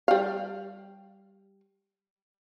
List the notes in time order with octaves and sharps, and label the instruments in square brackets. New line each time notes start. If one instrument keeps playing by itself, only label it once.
[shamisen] G3 F5